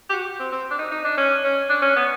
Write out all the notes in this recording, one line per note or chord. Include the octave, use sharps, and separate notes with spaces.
G4
F#4
C4
C4
D4
D#4
D#4
D4
C#4
C#4
D4
C#4
B3